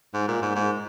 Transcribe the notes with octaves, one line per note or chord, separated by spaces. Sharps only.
G#2
A#2
G#2
G#2